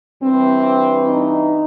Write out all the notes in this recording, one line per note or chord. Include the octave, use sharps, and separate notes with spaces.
G2 E3 C4
D#4